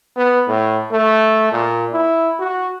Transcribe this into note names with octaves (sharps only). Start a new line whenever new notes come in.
B3
A2
A3
A#2
E4
F#4